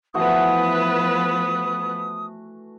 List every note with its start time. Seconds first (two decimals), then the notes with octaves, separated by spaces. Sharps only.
0.14 E3 F3 A3 B3 F#4 B4 D#6